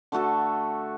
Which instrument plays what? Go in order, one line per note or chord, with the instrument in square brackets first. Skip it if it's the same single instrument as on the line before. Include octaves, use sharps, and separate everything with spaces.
[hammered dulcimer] D3 A3 F#4 A4